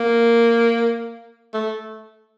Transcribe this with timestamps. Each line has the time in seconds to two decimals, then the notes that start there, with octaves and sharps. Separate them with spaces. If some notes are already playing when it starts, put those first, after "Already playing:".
Already playing: A#3
1.54 A3